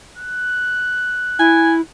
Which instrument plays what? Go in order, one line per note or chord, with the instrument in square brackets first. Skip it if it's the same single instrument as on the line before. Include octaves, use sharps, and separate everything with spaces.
[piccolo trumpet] F#6
[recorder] E4 [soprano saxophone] G#5